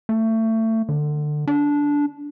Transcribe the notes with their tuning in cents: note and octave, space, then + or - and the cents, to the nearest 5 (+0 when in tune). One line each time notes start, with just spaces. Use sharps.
A3 +25
D3 +25
D4 -15